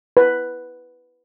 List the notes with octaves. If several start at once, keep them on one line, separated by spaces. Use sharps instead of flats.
B4